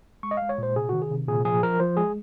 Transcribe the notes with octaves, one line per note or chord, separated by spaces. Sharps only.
G#3 C#6
D#5
G#3 F5
C#5
A#2 C5
C3 G#4
D#3 F#4
G#4
C3
A#2 G#4
F3 G#4
F3 A#4
F3 C5
G#3 G#4